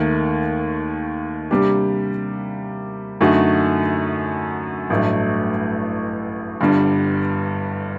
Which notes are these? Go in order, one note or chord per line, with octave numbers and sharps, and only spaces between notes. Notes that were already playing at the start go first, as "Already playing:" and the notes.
Already playing: D#2 D#3 A3
C3 G3 A#3 D4 G4
F#2 D3 A3 D#4 F#4
A1 G2 F#3 A3
G1 G2 D3 G3